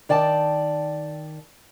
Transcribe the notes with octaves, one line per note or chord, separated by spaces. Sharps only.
D#3 D5 G5 A5